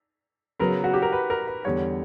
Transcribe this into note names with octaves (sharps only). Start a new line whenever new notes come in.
C#3 F#3 B3 A#4
F#4
G4
A#4
B4
A#4
B4
E2 D3 G3 C#5